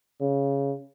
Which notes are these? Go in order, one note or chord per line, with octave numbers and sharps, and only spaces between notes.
C#3